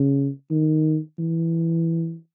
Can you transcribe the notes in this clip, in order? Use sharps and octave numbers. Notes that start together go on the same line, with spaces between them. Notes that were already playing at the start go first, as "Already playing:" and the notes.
Already playing: C#3
D#3
E3